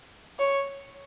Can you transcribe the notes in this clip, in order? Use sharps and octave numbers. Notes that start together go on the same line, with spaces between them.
C#5